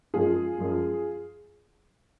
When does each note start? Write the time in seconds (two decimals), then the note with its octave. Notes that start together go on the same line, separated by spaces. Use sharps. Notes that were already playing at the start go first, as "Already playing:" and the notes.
0.14 F#2 F3 G#3 F4 G#4
0.58 F#2 F3 G#3